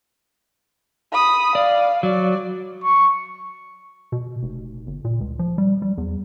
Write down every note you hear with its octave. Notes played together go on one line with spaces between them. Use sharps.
B5 D#6
D5 F5
F#3 D5
C#6
B2
F1
G1
A#2
C#2
F3
G3
G3
E2